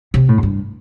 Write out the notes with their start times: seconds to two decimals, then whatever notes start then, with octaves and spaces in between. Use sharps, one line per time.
0.14 C3
0.28 A2
0.37 F#2
0.43 G2